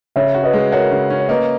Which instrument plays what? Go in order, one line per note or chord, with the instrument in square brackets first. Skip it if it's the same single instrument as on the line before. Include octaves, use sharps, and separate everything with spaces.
[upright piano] C#3 [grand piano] C#5 E5
[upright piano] F#4
[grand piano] B4 D#5
[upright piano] G#3
[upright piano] F#4 [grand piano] A#4 C#5
[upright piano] C#3
C#4
[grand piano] C#5
[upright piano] A#3 [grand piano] B4 D#5